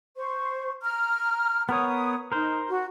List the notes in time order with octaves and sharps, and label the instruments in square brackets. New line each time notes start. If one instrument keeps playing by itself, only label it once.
[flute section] C5 C#6
A#5 F6
[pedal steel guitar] B3 A#4 C#5 [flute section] D#6
[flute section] D#4 [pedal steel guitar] A#4 C5
[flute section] F#4